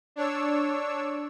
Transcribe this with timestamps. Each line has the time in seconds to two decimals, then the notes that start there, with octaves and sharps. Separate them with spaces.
0.16 D4 C#5 E6